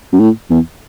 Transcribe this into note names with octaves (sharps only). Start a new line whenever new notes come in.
F#2
A2
E2